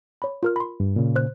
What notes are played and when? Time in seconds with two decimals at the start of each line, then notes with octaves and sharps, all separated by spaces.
0.22 C#5 B5
0.43 F4 A#4 F6
0.56 B5 C6
0.80 G2
0.96 A#2 C#3
1.16 C5 F#6